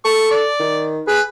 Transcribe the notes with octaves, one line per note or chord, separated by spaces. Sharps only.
A4 C#6
D5
D#3
G#4 B4